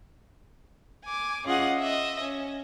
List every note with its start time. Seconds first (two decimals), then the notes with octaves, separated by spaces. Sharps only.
1.05 G#5 D6
1.45 C#4 F4 G#4 D#5 F#5
1.77 D#5 E5
2.21 C#4